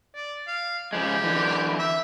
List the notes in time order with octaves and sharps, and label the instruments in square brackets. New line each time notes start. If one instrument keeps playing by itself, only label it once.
[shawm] D5
F5
[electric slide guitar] C#3 F3 G#3 [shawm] G4
[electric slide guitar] D3 E3
[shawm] E5